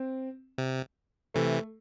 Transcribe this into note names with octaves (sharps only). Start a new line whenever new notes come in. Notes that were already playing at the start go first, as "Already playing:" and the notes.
Already playing: C4
C3
C3 E3 A3